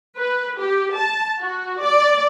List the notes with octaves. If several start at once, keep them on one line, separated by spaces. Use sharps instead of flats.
B4
G4
A5
F#4
D5